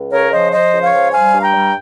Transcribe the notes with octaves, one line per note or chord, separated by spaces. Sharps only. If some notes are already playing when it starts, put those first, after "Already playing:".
Already playing: C#2
C#3 A#4 C#5
F3 C5 D#5
F3 C5 D#5
C#2
C#5 F5
F3
G3 F5 G#5
G2
G5 A#5
G3